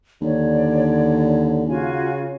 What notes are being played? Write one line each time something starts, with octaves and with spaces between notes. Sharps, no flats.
D#2 D3 C#5 D5
C#3 F4 F#4 G#5